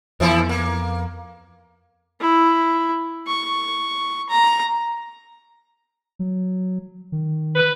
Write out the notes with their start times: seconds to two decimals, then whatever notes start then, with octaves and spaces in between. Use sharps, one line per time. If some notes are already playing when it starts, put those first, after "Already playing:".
0.20 F2 E3 F3 B3 E4
0.49 A#3
2.21 E4
3.27 C#6
4.29 A#5
6.19 F#3
7.12 D#3
7.55 B4